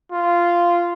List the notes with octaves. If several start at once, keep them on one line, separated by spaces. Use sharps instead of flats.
F4